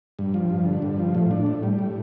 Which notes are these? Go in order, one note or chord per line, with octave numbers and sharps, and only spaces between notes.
G2
F3
G2
D3
G2
F3
A2
D4
A2
G3
A2